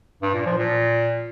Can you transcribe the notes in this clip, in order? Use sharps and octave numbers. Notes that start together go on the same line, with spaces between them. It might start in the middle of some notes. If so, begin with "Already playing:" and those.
G2
A#2
F3
A#2